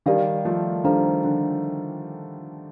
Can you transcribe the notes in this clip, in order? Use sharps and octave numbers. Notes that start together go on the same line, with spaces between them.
D#3 G3 D#4 G4 A#4 D5 F5
F3 A3
D#3 G3 D4 A4 C5 F5 A#5
D3 F3